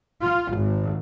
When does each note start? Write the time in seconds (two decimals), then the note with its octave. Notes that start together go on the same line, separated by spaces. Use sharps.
0.23 F4
0.56 G#1